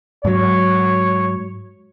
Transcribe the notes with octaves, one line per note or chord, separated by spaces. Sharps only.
G#2 F#3 C#5